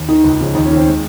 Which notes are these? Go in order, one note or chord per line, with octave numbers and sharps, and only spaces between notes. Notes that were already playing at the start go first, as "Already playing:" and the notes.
Already playing: D#2
D#3 D#4
C#2
C#3 F3
D#2 D#4
C#4
D#3
C4
G#3